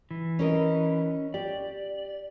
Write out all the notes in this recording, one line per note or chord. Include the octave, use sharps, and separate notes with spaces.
E3
C#4 A#4 D#5
G4 D5